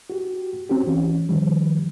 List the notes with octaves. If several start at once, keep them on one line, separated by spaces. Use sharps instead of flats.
F#4 G4
C4 C#4 F#4 G4
E3 C#4
D#3 F3 G3